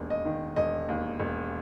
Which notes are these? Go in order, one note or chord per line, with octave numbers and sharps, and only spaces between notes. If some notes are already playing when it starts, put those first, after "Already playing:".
Already playing: E1 D#2
D#5
D#3
E1 D#5
D#2
E1